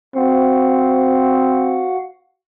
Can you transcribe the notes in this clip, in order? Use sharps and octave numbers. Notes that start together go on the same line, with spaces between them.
C4 F#4 F5 F#5